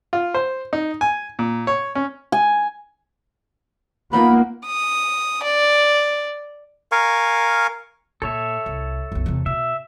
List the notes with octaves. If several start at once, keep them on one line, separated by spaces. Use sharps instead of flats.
F4
C5
D#4
G#5
A#2
C#5
C#4
G#5
A#3 B3 D#4 F4 B5
D#6
D5
A#4 F5 G#5 C#6
A#2 A4 C#5 E5
C2
B1 F#2
E2 C3
B2 E5